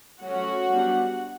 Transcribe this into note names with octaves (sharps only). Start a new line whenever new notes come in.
F#3 A3 C#4 F#4 F#5
G3 B3 D4